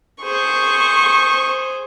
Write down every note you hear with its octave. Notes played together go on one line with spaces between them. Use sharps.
G#4 C5 C#6